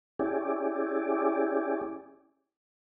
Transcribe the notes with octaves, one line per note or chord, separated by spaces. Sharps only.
C#4 E4 G4 G#4 D5